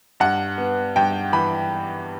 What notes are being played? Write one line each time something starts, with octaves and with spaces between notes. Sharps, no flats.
G2 F#5
B3
G2 G5
E3 B5